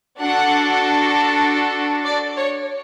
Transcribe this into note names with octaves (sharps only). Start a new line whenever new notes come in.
D4 F#4 A4 F#5
D5
C#5